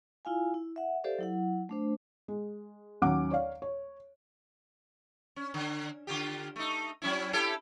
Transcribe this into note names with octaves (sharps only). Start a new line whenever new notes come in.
E4 F4 F5 G#5
E4
E5 F#5
G4 A4 C5 D5 E5 F5
F#3 E4 F#5
A3 D4 C5
G#3
D#2 F#3 C#4 F#5 D6
C#5 D5 F5
C#5
C#4
D3
D3 F4 G4
A3 D#4
F#3 C#4 E4
E4 G4 A4